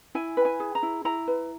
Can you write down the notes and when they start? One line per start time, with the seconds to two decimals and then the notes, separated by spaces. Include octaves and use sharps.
0.15 E4 G#5
0.37 B4
0.45 G#5
0.60 G#4
0.75 A#5
0.83 E4
1.05 E4 A#5
1.28 B4